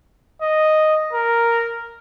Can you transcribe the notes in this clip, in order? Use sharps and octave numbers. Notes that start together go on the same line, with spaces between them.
D#5
A#4